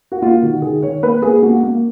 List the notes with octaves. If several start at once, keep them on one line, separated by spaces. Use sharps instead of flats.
F#4
A#3 F4
D#3 F#4
D#3 G#4
D#3 C#5
A#3 B4
A#3 G#4
A#3 F#4
A#3